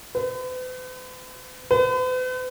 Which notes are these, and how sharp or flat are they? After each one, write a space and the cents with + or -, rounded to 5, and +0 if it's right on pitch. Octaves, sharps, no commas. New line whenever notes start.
B4 +45
B4 +45